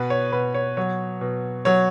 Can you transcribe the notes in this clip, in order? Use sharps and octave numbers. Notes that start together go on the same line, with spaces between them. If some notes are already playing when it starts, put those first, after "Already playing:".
Already playing: B2 B4
C#5
B2 B4
C#5
F#3 C#5
B2
F#3 C#5